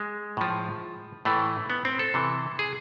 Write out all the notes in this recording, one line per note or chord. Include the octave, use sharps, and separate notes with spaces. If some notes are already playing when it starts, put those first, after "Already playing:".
Already playing: G#3
A2 F3
A2 E3 A3
B3
C4
A4
C3 E3
G#4